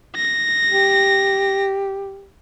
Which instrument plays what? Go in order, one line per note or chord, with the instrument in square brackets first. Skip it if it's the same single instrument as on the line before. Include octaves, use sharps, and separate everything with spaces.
[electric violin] A#6
[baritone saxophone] G4